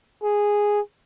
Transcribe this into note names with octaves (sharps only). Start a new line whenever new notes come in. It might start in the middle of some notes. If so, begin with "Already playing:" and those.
G#4